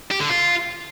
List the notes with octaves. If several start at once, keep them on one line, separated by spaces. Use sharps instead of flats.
G4
D3
F4